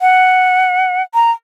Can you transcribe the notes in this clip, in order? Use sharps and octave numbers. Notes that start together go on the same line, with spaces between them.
F#5
A#5